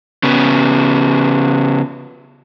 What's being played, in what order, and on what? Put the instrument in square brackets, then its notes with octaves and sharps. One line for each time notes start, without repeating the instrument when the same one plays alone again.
[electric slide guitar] C#3 B3